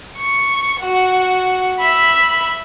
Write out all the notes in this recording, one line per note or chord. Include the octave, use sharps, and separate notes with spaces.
C#6
F#4
E5 B5